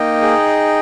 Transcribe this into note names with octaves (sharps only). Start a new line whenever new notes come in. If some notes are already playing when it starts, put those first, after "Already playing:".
Already playing: A#3 D#4 D#5 G5
G#4